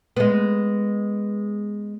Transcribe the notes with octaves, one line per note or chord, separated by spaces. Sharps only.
G#3 B3